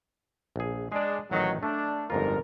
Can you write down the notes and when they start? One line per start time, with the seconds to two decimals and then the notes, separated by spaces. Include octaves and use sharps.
0.56 A#1 G#4
0.92 G#3 D4 G#4 D5
1.31 A1 D#3 F#3 D#4
1.63 A3 D4
2.10 G1 F2 G#2 F4 A#4